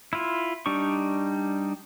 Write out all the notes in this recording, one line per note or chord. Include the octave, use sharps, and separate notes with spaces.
E4 F4
G3 D4 D#4 C#6